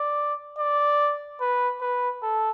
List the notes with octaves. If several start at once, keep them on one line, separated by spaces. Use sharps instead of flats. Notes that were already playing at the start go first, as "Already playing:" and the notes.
Already playing: D5
D5
B4
B4
A4